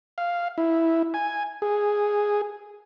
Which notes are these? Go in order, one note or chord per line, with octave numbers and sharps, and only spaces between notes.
F5
E4
G#5
G#4